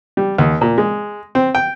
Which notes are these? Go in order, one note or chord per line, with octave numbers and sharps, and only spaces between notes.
G3
D#2
A#2
G#3
C4
G5